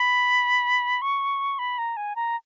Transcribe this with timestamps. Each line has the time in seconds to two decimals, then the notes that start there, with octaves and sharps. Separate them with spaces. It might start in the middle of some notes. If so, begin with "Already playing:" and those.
Already playing: B5
1.02 C#6
1.59 B5
1.78 A#5
1.97 G#5
2.16 A#5